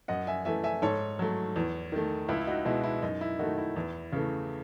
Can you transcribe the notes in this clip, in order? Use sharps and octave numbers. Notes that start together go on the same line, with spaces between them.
F#2 D#5 F#5
E5 G#5
E3 A3 E5 G#5
E5 G#5
G#2 A4 C#5
F#3 A3
E2
D#3 A3
C#2 E4
D#4 F#4
B2 G#3 E4
E4
F#2 D#4
E4
D#3 A3 D#4 F#4
E4
E2
C#3 E3 A3